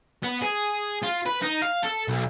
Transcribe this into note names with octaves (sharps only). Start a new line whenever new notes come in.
B3
G#4
F4
B4
D#4
F5
A4
B1